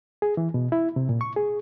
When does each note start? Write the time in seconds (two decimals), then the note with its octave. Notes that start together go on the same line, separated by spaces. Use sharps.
0.22 G#4
0.37 E3
0.54 B2
0.72 E4
0.96 C3
1.09 A#2
1.21 C#6
1.37 G#4